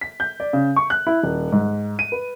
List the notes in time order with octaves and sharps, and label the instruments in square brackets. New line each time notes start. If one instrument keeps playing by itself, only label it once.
[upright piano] B6
G6
D5
C#3
C#6
F#6
E4
D#1
G#2
D#7
B4